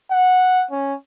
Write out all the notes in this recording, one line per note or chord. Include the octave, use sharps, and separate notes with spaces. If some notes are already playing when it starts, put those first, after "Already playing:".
F#5
C#4